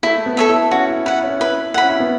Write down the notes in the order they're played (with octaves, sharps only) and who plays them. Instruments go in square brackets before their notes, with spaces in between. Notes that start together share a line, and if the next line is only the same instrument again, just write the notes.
[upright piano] A3 [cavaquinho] E4
[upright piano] B3
[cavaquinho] A4 C#5 E5
[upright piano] E4
[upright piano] C#4 [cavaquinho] F#4
[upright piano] E4
[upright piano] E4 [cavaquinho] B4 F#5
[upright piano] C#4
[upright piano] E4 [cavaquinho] B4
[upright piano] E4 [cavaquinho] F#5
[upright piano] C#4 [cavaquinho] B5
[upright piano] E4
B3